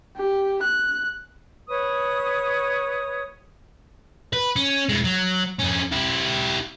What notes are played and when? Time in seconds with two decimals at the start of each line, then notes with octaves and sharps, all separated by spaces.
0.17 G4
0.62 F#6
1.68 B4 C#5 C#6 D#6
4.33 B4
4.56 C#4
4.89 G#3 E4
5.04 F#3
5.60 F2 C#4
5.92 E4 G4